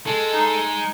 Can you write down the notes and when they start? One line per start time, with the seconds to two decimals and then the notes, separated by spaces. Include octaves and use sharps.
0.07 G#3 A4
0.33 D#4